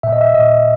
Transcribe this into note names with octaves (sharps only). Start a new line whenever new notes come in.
A#2 E5
D#5
E5
A#2 D#5